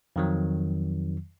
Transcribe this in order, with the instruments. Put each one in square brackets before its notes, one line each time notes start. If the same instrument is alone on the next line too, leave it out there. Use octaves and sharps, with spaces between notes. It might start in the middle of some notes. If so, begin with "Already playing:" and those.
[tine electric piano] F2 D#3 F#3